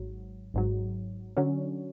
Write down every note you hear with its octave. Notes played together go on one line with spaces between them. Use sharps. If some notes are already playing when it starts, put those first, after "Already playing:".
Already playing: G#1 G#2 F#3
G#1 G#2 F#3
D3 F#3 C#4